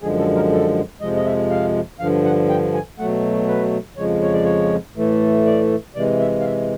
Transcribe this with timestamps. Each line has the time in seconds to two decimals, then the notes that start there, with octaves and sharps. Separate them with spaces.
0.02 F#2 D3 F3 G#3 G#4
0.19 A4
0.35 A#4
0.52 A4
1.01 F2 C3 F3 G#3 D#5
1.16 D#5
1.25 E5
1.51 F5
2.00 G2 D3 F3 F5
2.24 F#5
2.49 G5
2.74 G#5
2.99 B2 F#3 A3 F#5
3.48 B4
3.97 F2 C#3 F3 G#3 C#5
4.22 C#5
4.33 D5
4.44 C#5
4.96 A2 E3 A3
5.46 D5
5.95 C3 E3 G#3 D5
6.20 E5
6.40 F5
6.45 E5